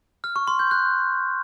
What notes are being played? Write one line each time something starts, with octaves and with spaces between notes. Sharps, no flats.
F6
C#6
C6
G6
F#6